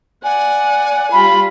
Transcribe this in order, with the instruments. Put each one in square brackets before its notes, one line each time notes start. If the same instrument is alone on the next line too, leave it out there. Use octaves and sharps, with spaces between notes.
[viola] D5 F#5 [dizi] G#5
[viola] G3 F4 [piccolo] B5